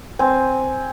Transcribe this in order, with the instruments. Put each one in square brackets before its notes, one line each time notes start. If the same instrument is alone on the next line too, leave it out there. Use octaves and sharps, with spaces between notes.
[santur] C4 [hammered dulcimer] G#5